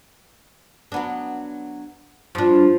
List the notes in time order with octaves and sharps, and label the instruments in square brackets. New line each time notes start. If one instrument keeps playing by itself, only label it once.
[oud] F#3 B3 D4
[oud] G2 D4 [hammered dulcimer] F3